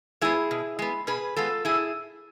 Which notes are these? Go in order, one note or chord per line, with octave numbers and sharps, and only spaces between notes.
G#3 B3 E4 G#4
B2
G#3 B3
B2 G#4 B4
G#3 B3 F4 A4
A2 E4 G#4